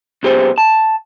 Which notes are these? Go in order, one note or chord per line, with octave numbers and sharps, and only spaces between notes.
B1 A#2 G4 G#4 C5
A5